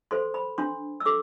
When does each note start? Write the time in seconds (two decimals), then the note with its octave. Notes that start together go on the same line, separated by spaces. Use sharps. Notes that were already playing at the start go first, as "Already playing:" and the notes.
0.11 A4 C5 C6
0.34 B5
0.58 D4 C6
1.00 E6
1.06 A4 D6